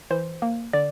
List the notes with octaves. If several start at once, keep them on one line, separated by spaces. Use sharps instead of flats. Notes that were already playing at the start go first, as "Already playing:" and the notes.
E3 C5
A#3
D3 D5